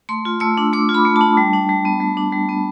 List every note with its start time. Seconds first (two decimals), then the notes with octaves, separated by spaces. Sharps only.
0.09 A3 C6
0.25 F4
0.40 A3 E6
0.58 D4
0.73 A3 D6
0.89 F4
0.94 B5
1.05 A3
1.16 D4 A5
1.37 G3
1.53 D4
1.69 G3
1.85 B3
2.00 G3
2.17 D4
2.32 G3
2.49 B3